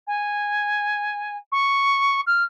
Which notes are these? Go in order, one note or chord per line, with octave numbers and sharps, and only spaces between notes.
G#5
C#6
F6